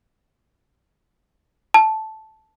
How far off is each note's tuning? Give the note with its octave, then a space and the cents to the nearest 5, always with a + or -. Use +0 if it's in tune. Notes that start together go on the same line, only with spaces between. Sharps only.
A5 -5